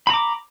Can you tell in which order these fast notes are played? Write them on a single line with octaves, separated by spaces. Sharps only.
B5 A#5 D6